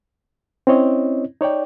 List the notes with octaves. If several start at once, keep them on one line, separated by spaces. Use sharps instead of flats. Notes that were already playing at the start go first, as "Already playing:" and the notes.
C4 C#4 E4 C#5 D#5
D#4 C#5 D5 G5